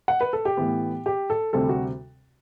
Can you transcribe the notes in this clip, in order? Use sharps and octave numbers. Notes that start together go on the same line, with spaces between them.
F#5
B4
A4
G4
A2 E3 B3
G4
A4
D2 C3 G3 C4 A4
F#4